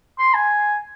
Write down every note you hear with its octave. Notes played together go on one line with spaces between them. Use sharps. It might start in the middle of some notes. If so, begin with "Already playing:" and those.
C6
G#5